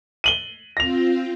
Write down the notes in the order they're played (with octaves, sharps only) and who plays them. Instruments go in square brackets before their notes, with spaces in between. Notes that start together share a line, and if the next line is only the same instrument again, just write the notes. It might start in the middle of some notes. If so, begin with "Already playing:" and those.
[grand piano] D#7 F#7 G7
[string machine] C4 F4 [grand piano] A#6 F7